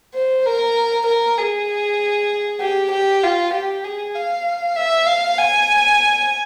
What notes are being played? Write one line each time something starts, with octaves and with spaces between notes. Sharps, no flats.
C5
A#4
A#4
G#4
G4
G4
F4
G4
G#4
F5
E5
F5
G#5